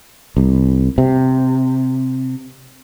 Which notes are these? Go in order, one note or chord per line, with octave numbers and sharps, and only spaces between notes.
C2
C3